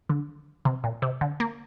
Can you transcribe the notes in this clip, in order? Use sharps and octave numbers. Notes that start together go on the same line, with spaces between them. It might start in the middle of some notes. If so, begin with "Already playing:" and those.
D3
C3
A#2
C3
D3
A#3